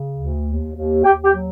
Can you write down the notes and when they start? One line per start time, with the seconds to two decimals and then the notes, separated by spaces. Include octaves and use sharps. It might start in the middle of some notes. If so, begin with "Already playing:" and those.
Already playing: C#3
0.17 D2
0.46 D#2
0.75 D#2
1.04 D#2 G4 G5
1.24 G4 G5
1.33 F#3